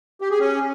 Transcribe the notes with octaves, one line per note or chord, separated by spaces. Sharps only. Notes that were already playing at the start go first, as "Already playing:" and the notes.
G4
G#4
C#4